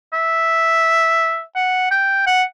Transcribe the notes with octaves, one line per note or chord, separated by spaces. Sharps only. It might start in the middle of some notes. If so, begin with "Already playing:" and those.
E5
F#5
G5
F#5